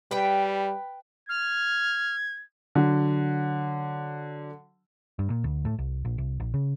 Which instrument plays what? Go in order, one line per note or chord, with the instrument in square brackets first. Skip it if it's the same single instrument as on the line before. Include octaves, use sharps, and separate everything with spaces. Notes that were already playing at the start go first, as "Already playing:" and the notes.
[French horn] G3 [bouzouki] B4 G5
[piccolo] F6 [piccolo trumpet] G#6
[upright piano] D3 F#3
[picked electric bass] G2
A#2
D2
A2
C2
A#1
C2
A#1
C#3